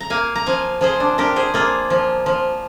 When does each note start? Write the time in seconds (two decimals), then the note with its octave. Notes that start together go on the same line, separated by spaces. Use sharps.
0.01 A#5
0.10 A#3 F5 G#5
0.35 A#5
0.46 F3 F5 G#5
0.81 F3 G#4 C5
1.00 D4
1.18 D4 G4 A#4
1.36 G#4 C5
1.54 A#3 F4 G#4
1.90 F3
2.26 F3